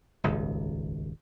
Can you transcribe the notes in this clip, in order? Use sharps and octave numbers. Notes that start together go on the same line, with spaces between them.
D#1 G#1 C#2